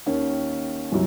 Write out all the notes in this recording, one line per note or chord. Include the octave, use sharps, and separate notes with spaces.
D#2 D#3 C#4
C2 F#2